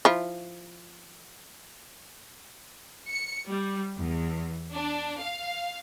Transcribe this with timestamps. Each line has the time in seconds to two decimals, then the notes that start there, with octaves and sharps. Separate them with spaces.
0.05 F3 E4
3.09 C#7
3.48 G3
3.96 E2
4.73 D4
5.18 F5